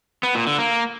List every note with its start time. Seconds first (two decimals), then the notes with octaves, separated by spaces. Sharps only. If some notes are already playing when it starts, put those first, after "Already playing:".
0.23 B3
0.35 A#2
0.47 D3
0.59 A#3